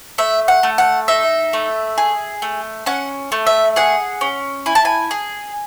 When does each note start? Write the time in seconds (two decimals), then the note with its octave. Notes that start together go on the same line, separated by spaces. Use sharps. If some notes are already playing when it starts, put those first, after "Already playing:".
0.18 A3 E5
0.48 F#5
0.63 A3
0.78 F#5
1.08 D#4 E5
1.53 A3
1.98 G#4
2.42 A3
2.86 C#4 F#5
3.32 A3
3.47 E5
3.76 G#4 F#5
4.21 C#4
4.66 E4 G#5
4.75 A5
4.85 G#5
5.11 G#4